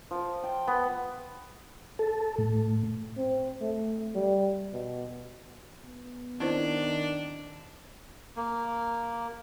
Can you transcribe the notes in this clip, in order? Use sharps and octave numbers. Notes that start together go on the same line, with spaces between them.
F3
G5
B3
A4
A2
C4
A3
G3
B2
B3
D#3 C4 D4 E4 C5
A#3